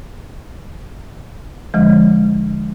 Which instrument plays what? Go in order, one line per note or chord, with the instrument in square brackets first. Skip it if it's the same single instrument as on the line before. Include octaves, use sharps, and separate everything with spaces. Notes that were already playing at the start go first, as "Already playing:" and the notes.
[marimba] E2 D3 F3 G#3